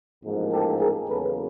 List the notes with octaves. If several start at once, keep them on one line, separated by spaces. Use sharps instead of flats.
A1 G#2 F3 A#3
G4 A4
G#4 A#4
E2 C#3 F#3 A#3 A4 B4